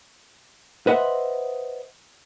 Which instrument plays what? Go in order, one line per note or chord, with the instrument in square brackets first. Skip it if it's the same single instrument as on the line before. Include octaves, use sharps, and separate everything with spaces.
[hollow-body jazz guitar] B4 C5 D#5 E5 F#5